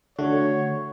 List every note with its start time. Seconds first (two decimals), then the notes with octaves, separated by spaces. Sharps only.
0.18 D3 A3 F#4 C#5